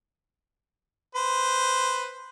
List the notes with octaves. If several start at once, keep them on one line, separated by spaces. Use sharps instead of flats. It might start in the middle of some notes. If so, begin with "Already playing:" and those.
B4 C5